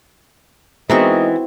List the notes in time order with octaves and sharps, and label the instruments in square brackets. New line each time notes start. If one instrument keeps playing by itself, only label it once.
[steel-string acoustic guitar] E3 [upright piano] G#3 D#4 A#4 [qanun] B3 C4 F#4 [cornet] D#5